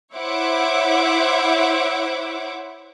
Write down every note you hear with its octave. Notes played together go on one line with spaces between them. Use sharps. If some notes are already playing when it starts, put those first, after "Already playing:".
E4 C5 C#5 E5 F#5 D6